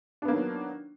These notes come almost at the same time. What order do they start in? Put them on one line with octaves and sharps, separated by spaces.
D4 B3 A#3 D#3 F#3